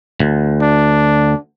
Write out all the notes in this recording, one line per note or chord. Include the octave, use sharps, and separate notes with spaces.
D2
D4